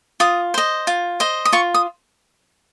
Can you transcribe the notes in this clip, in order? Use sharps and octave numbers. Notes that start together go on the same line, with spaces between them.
F4 D#6
C5 D#5
F4
C5 D#5
D#6
F4 C#6
D#6